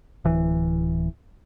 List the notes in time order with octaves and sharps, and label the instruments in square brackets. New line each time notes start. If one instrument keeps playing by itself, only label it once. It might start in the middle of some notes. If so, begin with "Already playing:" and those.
[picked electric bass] D1 E3